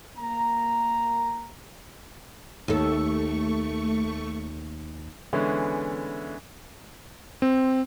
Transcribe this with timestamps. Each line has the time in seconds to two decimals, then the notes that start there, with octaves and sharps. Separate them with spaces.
0.17 A#3 A#5
2.68 D#2 A3 A4 C#6
5.33 D3 E3 G#3 B3 C#4
7.42 C4